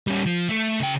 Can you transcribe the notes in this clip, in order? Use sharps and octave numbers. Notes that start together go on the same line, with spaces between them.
G3 C#4
F3
A3
C#3 G5